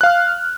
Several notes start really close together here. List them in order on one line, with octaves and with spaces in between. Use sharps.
F#6 F5 F6